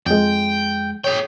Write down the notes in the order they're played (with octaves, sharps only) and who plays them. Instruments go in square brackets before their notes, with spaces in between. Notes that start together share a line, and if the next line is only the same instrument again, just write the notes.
[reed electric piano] F2 G#3 [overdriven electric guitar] G5
[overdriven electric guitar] G#4 G5 [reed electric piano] C#5